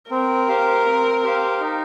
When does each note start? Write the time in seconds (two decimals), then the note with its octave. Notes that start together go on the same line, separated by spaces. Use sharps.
0.11 C4 A#4
0.48 G4 C5 F5
0.86 C4
1.23 G4 C5 F5
1.60 D#4